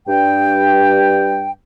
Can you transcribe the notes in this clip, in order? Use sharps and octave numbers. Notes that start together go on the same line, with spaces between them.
G2 G5